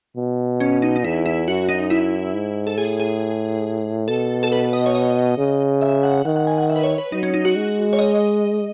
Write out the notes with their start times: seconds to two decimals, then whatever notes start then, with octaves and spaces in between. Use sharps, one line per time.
0.17 B2
0.60 C#4
0.82 D#4
0.96 D#4
1.04 E2 E4
1.26 E4
1.48 F#2 F#4
1.69 D#4
1.90 E4
2.34 G#2
2.67 A4
2.77 A2 G#4
3.00 G#4
4.08 B2 A4
4.43 A4
4.52 B4
4.73 D#5
4.86 C#5
4.95 D#5
5.38 C#3
5.81 E5
6.03 F#5
6.25 D#3 F#5
6.36 F#5
6.47 G#5
6.58 F#5
6.69 E5
6.76 B4
6.83 C#5
6.98 B4
7.12 F#3 D#4
7.23 C#4
7.34 D#4
7.45 F#4
7.56 G#3
7.93 C#5
7.99 D#5